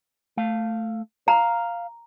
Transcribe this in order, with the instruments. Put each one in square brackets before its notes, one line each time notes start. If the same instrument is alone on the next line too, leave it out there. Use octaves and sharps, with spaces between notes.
[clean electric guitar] A3 F5
[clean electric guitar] F5 [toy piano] A#5